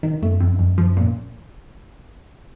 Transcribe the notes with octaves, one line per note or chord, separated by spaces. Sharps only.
D#3
F#2 A3
F2
F2
F3
A#2